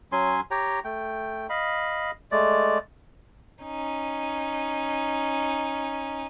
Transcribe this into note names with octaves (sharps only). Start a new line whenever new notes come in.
F#3 C#4 G#5 C6
G4 C#5 G5 A#5
A3 G5
D#5 F5 B5
G#3 A3 D5
C#4 D#4